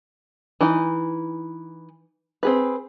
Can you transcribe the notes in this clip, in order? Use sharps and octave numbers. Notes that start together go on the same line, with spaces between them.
E3 D#4 G#5
C4 G#4 B4